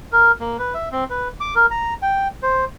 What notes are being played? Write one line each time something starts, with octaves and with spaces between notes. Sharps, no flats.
A#4
A#3
B4
E5
C4
B4
D6
A#4
A#5
G5
C5